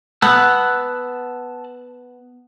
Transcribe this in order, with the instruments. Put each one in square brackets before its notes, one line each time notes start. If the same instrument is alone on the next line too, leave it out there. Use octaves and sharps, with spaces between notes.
[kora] B3 [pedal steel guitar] A5 E6 F#6